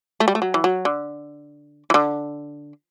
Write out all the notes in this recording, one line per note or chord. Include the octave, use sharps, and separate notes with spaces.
A3
G3
A3
F#3
E3
F#3
D3
E3
D3